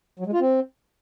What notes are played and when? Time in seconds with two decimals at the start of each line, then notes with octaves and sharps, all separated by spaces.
0.19 F#3
0.26 G#3
0.33 F4
0.40 C4